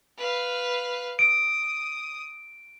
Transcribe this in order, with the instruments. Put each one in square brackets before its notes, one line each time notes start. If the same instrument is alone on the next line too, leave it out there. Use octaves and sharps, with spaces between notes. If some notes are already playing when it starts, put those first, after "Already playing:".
[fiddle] B4 F5
[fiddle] D#6 [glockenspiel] D7